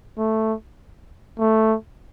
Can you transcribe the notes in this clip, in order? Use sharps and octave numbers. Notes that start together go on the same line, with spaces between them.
A3
A3